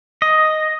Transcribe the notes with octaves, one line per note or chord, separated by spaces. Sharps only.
D#5